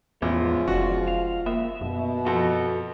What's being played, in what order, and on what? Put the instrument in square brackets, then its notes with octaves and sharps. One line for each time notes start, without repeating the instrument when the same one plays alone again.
[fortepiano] A1 [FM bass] E2 [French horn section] F3 G#3 F4 [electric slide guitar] B3
[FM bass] F1 [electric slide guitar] C#4 D5 [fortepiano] F#4
[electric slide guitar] F5
[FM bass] A#3 [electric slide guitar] E5
[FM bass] F#2 [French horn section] B2
[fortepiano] F2 [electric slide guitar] F#4 A4